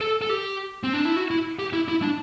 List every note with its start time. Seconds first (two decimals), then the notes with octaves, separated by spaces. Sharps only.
0.01 A4
0.22 A4
0.29 G4
0.84 C4
0.94 D4
1.05 E4
1.16 F#4
1.31 E4
1.59 G4
1.73 E4
1.88 E4
2.02 D4